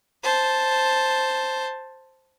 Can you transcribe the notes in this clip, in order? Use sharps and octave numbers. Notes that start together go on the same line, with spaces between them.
C5 A5